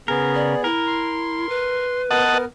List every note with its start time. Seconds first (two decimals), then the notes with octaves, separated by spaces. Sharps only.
0.08 C#3 B3 G#4 A#4
0.35 D5
0.64 E4 A#4
0.86 C6
1.49 B4
2.11 B3 A#4 D#5 F#5 A5